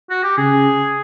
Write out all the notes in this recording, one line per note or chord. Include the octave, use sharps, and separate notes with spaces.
F#4
G4
C#3 G#4